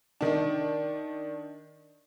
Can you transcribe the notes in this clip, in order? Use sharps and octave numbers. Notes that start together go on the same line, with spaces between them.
D#3 D4